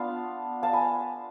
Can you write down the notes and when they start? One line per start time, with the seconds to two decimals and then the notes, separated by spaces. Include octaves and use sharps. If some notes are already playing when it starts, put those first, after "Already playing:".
Already playing: B3 D4 F4 F5 A5
0.63 F5 A5
0.73 G#5 B5